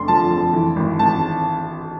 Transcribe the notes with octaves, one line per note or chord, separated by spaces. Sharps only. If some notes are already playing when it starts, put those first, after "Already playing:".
Already playing: F1 D3 C6
F3 A5
F2
E3
G#1
G#1 A5